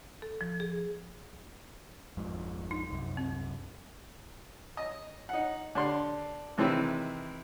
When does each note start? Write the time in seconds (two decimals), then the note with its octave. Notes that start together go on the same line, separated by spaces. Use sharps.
0.22 A4
0.41 F3
0.60 G#4
2.17 G#1 F2 G#2
2.71 D#4
2.90 C2 F#2
3.17 C4
4.77 D#5
5.29 D#4 F#5
5.75 D3 D4 G4 C6
6.57 C3 D#3 E3 G#3 C4 E4